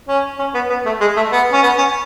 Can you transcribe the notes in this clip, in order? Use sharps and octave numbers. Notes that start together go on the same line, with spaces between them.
C#4
C#4
B3
B3
A3
G#3
A3
B3
C#4
B3
C#4